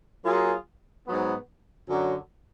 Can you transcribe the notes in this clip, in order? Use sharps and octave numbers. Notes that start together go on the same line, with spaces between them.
F#3 A#3 F4 G#4
G#2 F#3 B3
F#2 D3 F#3